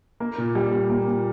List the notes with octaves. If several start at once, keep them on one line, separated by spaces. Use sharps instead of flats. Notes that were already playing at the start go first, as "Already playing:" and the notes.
A#3
A#2
G3
A#2
A#3
A#2